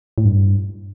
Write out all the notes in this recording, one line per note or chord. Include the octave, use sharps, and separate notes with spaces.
A2
G2